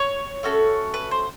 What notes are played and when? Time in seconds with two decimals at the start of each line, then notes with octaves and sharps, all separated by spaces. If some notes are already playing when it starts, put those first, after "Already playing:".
Already playing: C#5
0.43 A3 C#4 F#4 A4
0.94 B4
1.11 C5